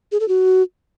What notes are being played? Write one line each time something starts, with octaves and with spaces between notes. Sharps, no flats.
G#4
A4
F#4